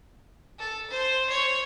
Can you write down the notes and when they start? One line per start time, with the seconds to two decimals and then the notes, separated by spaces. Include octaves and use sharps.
0.58 A4
0.90 C5
1.29 C#5